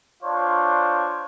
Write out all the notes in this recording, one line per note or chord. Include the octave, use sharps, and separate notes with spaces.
D4 F4 C5 C#5